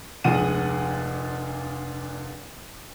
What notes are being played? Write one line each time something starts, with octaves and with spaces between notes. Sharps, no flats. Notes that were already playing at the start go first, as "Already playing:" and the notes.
F1 D2 A#2 G#3 F#5 D#7